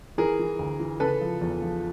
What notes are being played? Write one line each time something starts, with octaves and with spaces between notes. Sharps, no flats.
E3 G#4 A#4
E3
D2
E3
C#3 A4 B4
F3
E2
F3